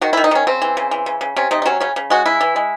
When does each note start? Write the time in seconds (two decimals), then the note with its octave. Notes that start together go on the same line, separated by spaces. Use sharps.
0.01 D#3 F#4
0.13 E4
0.17 D#3
0.24 D#4
0.31 D#3 C#4
0.47 C#3 C4
0.62 E3
0.77 C#3
0.91 E3
1.06 C#3
1.21 C#3
1.36 C3 C#4
1.51 C3 D#4
1.62 D#4
1.66 F#3 C#4
1.80 C#3 C#4
1.96 C#3
2.10 G#3 F#4
2.26 C#3 E4
2.41 E3
2.56 G#3